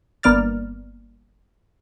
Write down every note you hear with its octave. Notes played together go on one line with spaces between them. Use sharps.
G1 A#3 B3 D5 F6 A6